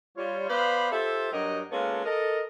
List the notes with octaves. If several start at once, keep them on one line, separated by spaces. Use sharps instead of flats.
G3 F4 C#5
B3 B4 C5 D5 F5 B5
F4 G4 A4 C5 E5
G2 F#3 F#4 A#4 D#5 G5
G#3 A#3 B3 C#4 F4 A4
A4 A#4 D#5